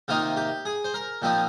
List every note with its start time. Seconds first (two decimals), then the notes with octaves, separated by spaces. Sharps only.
0.08 C3 D#3 A#3 D#4 F4
0.37 G4
0.65 G#4
0.84 C5
0.94 A#4
1.22 A#2 F3 C4 D#4 G4